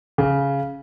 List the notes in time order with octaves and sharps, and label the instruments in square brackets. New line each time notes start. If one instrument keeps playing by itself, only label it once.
[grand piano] C#3